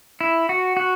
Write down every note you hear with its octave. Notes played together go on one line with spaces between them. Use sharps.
E4
F#4
F#4